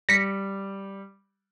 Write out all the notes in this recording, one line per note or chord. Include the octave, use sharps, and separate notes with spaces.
G3 A#6 B6 C#7